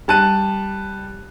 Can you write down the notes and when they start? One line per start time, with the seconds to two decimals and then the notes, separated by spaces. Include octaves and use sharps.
0.08 G3 A5 F#6 D#7